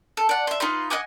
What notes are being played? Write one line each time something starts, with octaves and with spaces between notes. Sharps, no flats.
A4
D5 F#5
E5 C6
D#4 F4 B4 C6
D#5 F#5 G#5 D6